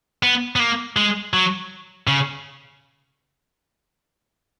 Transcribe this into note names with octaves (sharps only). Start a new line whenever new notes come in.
B3
B3
A#3
G#3
F#3
C#3